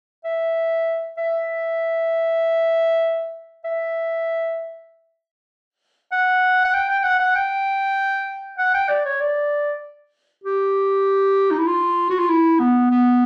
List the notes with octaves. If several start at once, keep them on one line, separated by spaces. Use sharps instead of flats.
E5
E5
E5
F#5
F#5
G5
G5
F#5
F#5
G5
F#5
G5
D5
C#5
D5
G4
D#4
E4
F4
F#4
F4
E4
B3
B3